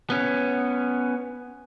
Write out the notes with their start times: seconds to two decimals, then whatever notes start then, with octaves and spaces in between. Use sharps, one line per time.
0.10 B3 C#4